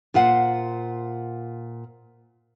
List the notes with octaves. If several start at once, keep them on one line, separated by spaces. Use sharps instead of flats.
A#2 F4 C5 F#5